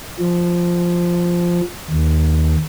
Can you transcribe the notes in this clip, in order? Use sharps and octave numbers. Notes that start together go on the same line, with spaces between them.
F3
D#2